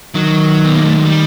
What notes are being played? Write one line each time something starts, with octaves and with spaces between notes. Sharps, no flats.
D#3 F#3
B3
A#3
A3
G#3
G3